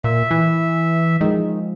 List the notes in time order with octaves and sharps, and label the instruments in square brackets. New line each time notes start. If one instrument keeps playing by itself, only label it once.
[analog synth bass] A#2 [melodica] E5
[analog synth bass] E3
[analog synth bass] D#3 [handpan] F3 G#3